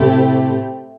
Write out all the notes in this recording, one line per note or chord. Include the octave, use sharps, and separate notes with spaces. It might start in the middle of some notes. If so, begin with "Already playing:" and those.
Already playing: A2 C3 A3 C4 E4 G4